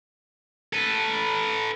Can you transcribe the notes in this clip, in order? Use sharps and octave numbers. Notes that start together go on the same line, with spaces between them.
A4 B4